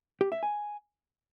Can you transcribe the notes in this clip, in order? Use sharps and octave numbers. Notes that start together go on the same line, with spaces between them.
G4
E5
G#5